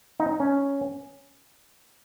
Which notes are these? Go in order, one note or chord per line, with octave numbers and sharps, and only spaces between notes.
D#4
C#4